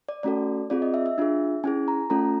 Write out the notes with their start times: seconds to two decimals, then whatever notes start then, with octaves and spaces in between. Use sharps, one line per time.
0.09 D5
0.23 A3 C#4 F#4 A4 D5
0.70 C4 F4 G#4 D5
0.82 D#5
0.94 E5
1.06 E5
1.18 D4 F4 G#4
1.64 C#4 E4 G#4 G#5
1.88 A#5
2.10 A3 C#4 F4 A4 A#5